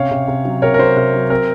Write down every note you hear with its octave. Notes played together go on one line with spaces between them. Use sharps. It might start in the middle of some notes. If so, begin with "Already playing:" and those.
Already playing: C3 C#4 C#5 F5
C3
C3
F#3
C3 A#4 C#5
A#4
F#3 C5
C3 A#4
F#3
C4 A#4